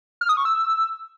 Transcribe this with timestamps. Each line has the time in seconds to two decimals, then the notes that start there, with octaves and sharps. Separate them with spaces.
0.21 F6
0.29 D#6
0.37 C#6
0.45 E6